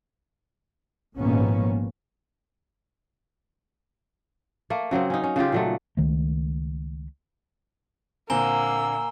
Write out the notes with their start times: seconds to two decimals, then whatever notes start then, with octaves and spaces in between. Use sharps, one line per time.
1.19 G#1 A#2 F3 A#3 B3 C#4
4.70 A3 A#3
4.91 C#3 F#3 A#3 C4
5.10 C#4 D#4
5.24 C#4
5.36 C#3 G#3 F4 G4
5.52 A#2 F#3 A3
5.97 C#2 D#3 A3
8.30 A#2 D3 A#3 C4 G#5 A#5 E6 G7